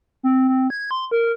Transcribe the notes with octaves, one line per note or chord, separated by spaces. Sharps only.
C4
C4
G#6
C6
A#4